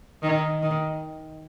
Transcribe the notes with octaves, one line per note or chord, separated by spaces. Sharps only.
D#3
D#3